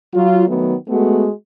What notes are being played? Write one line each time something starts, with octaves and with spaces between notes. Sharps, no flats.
F#3 F4
D#3 F#3 A3 B3
G#3 A3 B3 F#4